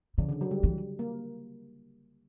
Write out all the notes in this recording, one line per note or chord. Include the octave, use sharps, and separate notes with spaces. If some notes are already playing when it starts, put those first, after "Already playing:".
C#3 E3
D3
F#3
G3
E3
A#3